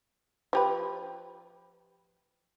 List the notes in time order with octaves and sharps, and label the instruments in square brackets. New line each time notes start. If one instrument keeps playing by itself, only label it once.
[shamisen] F3 G4 B4